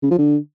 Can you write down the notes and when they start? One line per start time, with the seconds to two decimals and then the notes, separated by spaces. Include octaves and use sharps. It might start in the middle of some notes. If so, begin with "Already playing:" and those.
0.03 C#3
0.11 F3
0.19 D3